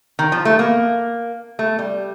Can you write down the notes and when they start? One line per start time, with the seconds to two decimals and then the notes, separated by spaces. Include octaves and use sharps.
0.19 D#3
0.32 F3
0.45 A3
0.59 A#3
1.59 A3
1.79 G3